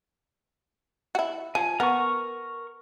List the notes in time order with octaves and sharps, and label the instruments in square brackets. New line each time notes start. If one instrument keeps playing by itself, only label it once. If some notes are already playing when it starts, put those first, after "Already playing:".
[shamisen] E4 F#4
[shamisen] F3 [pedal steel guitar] G#5
[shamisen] B3 [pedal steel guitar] A#4 C#6